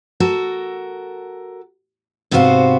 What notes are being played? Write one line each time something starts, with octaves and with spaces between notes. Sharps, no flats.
F#4 A4 A#4
G#2 C3 B3 F#4 C5 F5